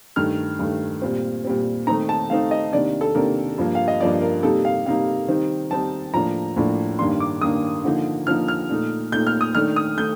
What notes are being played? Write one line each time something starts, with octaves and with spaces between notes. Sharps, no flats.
G2 D#3 A3 F6
G2 D#3 A3
A#2 G3 C4
A#2 G3 C4
D#3 A3 C4 D#4 A#5
A5
D#3 A3 C4 D#4 F5
D#5
C3 D#3 A#3 D4 D5
A4
C3 D#3 A#3 D4 A#4
G2 F3 A#3
F5
D#5
G2 F3 A#3 D5
A#4
C3 G3 A#3 D#4 A4
F5
C3 G3 A#3 D#4 F5
D#3 G3 C4 D#4
D#3 G3 C4 D#4 A5
A2 F3 A#3 D4 A#5
A2 F3 A#3 D4
G2 D#3 A#3 D4 C6
D6
G2 D#3 A#3 D4 D#6
D3 F3 A#3 D#4
D3 F3 A#3 D#4 F6
F6
A#2 A3 D#4
A#2 A3 D#4 G6
F6
D#6
D#3 A3 D4 F6
D#6
D#3 A3 G6